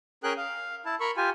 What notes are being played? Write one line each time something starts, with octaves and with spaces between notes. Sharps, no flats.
C#4 G#4 A#4 G5 F#6
F5
E4 A5
A#4 B5 C#6
F4 G4 G#5